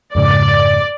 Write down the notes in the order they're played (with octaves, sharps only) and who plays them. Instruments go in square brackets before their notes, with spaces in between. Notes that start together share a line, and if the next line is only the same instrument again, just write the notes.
[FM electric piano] F2 G#2 C#3 [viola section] D5